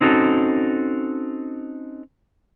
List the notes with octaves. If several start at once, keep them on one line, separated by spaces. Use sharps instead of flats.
C4 C#4 D#4 F#4 A4